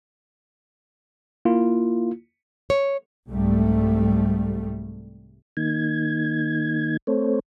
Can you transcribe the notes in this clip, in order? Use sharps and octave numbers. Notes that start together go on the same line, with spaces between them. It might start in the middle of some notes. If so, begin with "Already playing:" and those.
A#3 E4 F4
C#5
C2 G#2 G3 A3
D#3 A#3 D#4 G#6
A3 C4 A4 C5 C#5